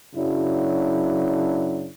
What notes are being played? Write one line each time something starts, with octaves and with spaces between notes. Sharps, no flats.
F#2 C#3 F#3 D4 E4